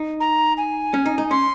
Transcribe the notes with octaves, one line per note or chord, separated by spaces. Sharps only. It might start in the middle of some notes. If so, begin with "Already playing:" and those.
Already playing: D#4
A#5
G#5
C#4
D#4
D#4
C#4 C6